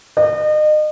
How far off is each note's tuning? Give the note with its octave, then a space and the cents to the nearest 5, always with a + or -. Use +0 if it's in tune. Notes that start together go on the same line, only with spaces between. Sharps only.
D#5 -35